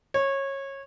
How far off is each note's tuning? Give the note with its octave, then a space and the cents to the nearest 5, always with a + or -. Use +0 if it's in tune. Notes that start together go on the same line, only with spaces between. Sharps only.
C#5 -20